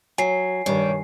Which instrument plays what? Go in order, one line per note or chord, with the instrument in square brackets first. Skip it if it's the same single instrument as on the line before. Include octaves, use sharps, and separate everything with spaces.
[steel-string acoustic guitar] F#3 [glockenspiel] G#5 C7
[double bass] G2 D#3 [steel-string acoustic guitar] G3 [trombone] C#5